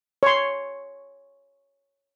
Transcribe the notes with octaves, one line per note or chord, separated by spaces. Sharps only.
C#5 C6